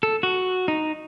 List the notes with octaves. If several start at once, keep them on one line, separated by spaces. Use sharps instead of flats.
A4
F#4
D#4